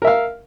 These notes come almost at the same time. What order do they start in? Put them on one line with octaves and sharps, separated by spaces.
A#4 E5 F5